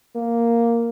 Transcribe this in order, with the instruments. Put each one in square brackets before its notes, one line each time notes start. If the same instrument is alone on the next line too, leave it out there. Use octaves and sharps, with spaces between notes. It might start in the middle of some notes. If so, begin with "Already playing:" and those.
[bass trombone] A#3